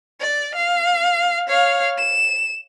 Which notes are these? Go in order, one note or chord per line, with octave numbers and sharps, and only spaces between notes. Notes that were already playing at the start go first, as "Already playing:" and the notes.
D5
F5
C#5 F5
E7